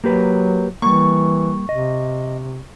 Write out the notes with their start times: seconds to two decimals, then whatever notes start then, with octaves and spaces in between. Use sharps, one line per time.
0.04 F#3 A#3 G4 B4
0.82 E3 G3 A#3 C#6
1.69 C3 D#5